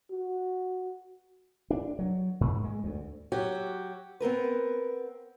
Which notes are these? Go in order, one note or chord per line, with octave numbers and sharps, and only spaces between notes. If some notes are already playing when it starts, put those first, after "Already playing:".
F#4
D4
F#3
G#2
G#3
D2
F#3 F#4 G4
B3 C4 A#4 B4